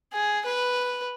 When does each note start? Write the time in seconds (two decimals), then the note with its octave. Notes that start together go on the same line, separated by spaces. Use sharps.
0.13 G#4
0.46 B4